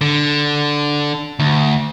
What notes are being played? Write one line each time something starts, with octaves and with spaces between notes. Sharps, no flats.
D3
D2